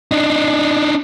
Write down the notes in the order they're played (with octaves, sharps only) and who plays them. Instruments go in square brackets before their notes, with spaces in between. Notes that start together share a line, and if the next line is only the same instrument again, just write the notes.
[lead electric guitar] D4 D#4